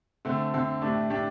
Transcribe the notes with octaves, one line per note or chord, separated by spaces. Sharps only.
D3 A3 C4
D3 A3 C4
A2 A3 D4 G4
A2 A3 D4 G4